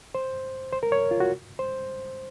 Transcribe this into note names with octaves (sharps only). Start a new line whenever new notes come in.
C5
C5
A#4
C#5
F4
F#4
C5